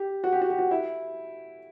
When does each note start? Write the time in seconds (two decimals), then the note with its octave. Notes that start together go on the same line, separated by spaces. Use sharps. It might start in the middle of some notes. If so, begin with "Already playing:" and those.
Already playing: G4
0.24 F#4
0.32 G4
0.41 F#4
0.50 G4
0.59 F#4
0.71 E4